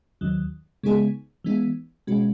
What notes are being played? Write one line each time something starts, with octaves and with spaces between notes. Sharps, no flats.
D#2 D#3 F#3
C#3 G#3 B3 D#4 G#4
E3 G#3 B3 D#4
B2 G#3 C#4 F#4